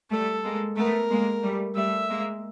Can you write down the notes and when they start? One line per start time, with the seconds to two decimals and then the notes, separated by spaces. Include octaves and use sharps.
0.11 G3 A3 A4
0.44 G#3 A#3
0.77 A3 B3 A#4
1.10 G#3 A#3
1.42 G3 A3
1.75 G3 A3 E5
2.09 G#3 A#3